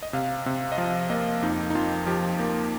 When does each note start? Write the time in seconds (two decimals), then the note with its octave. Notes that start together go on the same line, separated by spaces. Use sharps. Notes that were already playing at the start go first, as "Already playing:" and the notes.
0.03 D#5
0.13 C3 F5
0.46 C3
0.72 D#5
0.78 F3 F5
1.10 A#3 D#5
1.42 F2 D#4
1.70 D#4
1.75 F2 F4
2.07 F3 G4
2.39 A#3